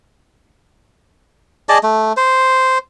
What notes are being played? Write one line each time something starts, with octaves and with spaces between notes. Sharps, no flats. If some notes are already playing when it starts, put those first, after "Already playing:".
G#4 D5 D#5 A5
A3
C5